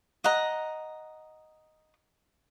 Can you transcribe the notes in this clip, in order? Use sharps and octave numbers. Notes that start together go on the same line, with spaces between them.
D#5 F#5 A#5